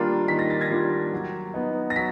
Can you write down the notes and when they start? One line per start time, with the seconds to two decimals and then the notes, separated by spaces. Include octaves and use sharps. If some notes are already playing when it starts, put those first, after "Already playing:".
Already playing: D#3 G3 A#3 D4 F4
0.28 D#3 B6
0.39 A#6
0.50 A6
0.61 G#6 A#6
0.71 G3 A#3 D4 F4
1.13 F#3
1.54 B3 D#4
1.90 A#6
1.96 F#3 B6